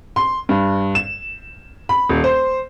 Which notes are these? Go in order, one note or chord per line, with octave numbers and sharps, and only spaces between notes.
C6
G2
E7
B5
D#1
C5